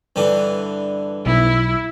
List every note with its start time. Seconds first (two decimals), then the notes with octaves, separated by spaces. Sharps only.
0.16 G2 D3 E3
1.26 B1 E4